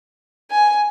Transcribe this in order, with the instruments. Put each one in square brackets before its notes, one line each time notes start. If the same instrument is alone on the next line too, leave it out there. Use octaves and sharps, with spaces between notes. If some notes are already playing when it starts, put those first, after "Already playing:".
[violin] G#5